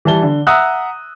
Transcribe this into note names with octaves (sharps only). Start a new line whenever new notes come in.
E3 G3 A5 G7
D3
E5 F#5 A#5 D#6 E6 F#6